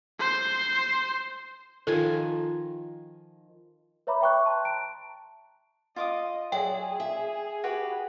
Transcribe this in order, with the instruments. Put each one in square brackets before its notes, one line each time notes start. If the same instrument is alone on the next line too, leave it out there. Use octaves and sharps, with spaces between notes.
[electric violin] C5 C6
[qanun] D#3 F3 G#5 [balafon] A4
[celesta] B4 C#5 E5 A#5 B5 D6
E5 G5 C#6 F#6
A5 C6
A5 A#5 D7
[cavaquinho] F4 D6 D#6 [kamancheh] D#5
[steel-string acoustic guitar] F#3 D5 E5 [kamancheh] G#4 [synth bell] G5
[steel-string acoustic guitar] E5
[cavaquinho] F#4 G4 B4